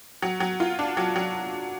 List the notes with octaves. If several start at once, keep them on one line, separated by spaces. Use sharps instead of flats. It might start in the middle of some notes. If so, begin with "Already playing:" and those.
F#3
F#3
F4
D4
F#3
F#3